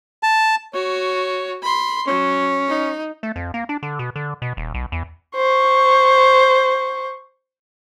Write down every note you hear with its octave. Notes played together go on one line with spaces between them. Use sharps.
A5
F#4 C#5
B5 C6
F#3 C#4
D#4
A3
F2
A#3
D4
D3
B2
D3
B2
D#1
B1
E2
C5 C#6